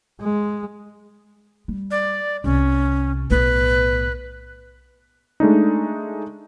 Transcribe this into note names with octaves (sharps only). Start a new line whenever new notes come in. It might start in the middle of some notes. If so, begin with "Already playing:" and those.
G#3
G3
D5
C2 C3 C#4
B1 A2 B4
G#3 A3 D4 D#4